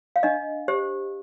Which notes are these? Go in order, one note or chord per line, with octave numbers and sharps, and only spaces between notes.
F5
D4 D#5
G4 C5